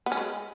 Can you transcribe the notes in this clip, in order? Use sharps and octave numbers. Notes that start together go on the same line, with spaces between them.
B3
C#4
G#3